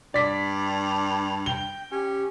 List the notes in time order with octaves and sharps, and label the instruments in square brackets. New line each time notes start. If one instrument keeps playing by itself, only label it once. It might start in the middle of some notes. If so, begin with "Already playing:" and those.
[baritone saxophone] G2 [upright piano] D5 B6
[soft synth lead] G5 [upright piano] G7
[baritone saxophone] C#4 [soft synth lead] G4